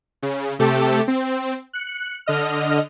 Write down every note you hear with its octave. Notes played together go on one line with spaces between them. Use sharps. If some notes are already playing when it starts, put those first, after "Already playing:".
C#3
C3 A3 G4 A4
C4
F#6 C#7
D3 D#5 F6